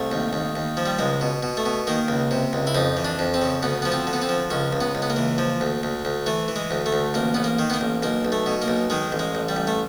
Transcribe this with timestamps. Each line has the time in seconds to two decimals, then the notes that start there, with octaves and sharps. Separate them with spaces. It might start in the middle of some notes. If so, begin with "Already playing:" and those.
Already playing: C2 A3
0.12 D#2
0.33 D#2
0.55 D#2
0.77 F3
0.86 G3
0.99 C#2 G#3
1.21 B2
1.43 B2
1.57 A3
1.66 B2
1.87 D#3 A#3
2.08 C#2
2.31 C3
2.53 C#2
2.67 E4
2.75 F2 D#4
2.97 E3
3.05 D4
3.19 F2
3.34 C4
3.42 C#3
3.63 D2 B3
3.82 F3 B3
3.92 C4
4.07 D3
4.13 B3
4.22 C4
4.29 F3
4.50 C#2 C#4
4.73 C#2
4.81 B3
4.95 C#2
5.02 B3
5.10 A#3
5.16 E3
5.38 F3
5.61 D2
5.83 D2
6.05 D2
6.26 E3 A3
6.48 E3
6.56 G#3
6.71 D2
6.86 A3
6.93 D2
7.14 A1 A#3
7.34 A1 B3
7.44 A#3
7.59 D#3
7.70 B3
7.74 A#3
7.81 A1
8.03 B1 A#3
8.25 B1
8.32 A3
8.46 B2
8.62 A#3
8.68 B1
8.90 D#3 G#3
9.12 A1
9.19 G#3
9.35 A1
9.49 G3
9.56 A1
9.67 A3